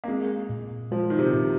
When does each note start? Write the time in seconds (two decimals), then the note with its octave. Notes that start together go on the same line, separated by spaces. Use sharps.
0.04 A#3
0.08 G#3 C4
0.49 A#2
0.91 F3 G#3
1.10 D#3
1.19 C3
1.33 A#2